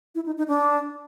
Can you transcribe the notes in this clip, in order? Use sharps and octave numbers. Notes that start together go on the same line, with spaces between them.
E4
D#4
D#4
D4